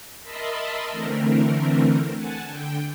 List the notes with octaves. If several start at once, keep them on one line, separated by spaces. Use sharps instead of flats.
A#4 D#5 E5 A5 B5 C6
D3 E3 A3 C4 A#4
F#5 G#5 A5
D3 G5